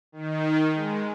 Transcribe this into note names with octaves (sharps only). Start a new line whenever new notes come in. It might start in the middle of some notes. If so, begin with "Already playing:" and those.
D#3
G#3